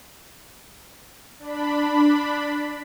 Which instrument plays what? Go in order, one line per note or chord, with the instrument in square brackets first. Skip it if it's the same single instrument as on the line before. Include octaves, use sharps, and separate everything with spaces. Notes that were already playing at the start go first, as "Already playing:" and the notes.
[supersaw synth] D4 B5